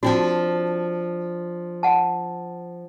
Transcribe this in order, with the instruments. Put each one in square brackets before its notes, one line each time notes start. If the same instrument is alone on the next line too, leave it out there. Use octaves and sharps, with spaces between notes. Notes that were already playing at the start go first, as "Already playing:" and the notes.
[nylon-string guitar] F3 C4 D4 [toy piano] F#4
[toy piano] F#5 A5